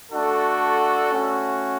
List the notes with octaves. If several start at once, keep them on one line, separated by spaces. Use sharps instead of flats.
A3 D4 F#4 A4
A3 C#4 F#4